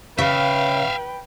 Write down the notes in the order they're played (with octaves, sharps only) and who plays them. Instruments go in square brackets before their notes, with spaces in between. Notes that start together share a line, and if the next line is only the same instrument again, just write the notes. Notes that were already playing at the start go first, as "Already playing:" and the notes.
[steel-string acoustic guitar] C#3 [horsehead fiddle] B4 G5 [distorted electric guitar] E5 F5